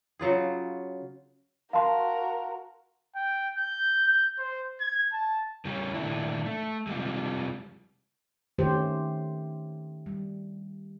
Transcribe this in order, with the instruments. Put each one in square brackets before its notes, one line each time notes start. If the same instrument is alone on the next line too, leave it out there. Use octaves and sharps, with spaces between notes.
[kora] C#3 F#3 F4 G#4
[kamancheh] F#4 A#4 [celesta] F5 A5 C6
[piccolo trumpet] G5
G6
G6
C5
G#6
A5
[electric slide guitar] C#3 G3 C#4
A#2 D#3 A3 D4 E4
A3
C3 F3 G3 G#3
[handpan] D#3 A3 C#4 G4 C5
G3